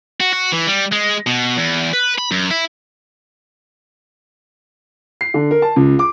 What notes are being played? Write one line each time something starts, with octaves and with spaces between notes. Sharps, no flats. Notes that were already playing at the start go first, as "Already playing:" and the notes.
F#4
F#4
E3
G3
G#3
B2
E2
B4
B5
F#2
E4
C7
D3
A#4
A5
C#2
D6